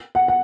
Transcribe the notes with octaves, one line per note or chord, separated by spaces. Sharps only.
F#5
F#5